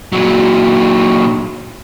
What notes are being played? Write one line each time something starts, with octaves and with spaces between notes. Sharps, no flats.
A#2 F#3